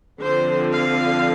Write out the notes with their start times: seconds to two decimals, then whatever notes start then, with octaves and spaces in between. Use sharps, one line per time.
0.20 D3 F3 C4 C5
0.72 F5